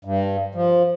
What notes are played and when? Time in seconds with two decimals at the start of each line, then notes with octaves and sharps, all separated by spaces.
0.05 G2
0.55 F3